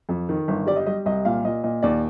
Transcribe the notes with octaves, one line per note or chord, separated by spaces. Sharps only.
F2
D#3
G1
G3 D5
D#5
G3 D#5
C2 D#5
A#2 F5
A#2 D#5
A#2 D#5
D#2 D5